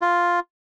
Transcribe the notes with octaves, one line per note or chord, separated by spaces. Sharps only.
F4